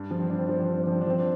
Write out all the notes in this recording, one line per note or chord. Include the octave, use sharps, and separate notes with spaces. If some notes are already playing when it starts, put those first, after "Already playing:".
Already playing: G2
F3
C4
G2 D4
C4
F3 D4
C4
G2 D4
C4
D4
F3 C4
D4
F3 C4
D4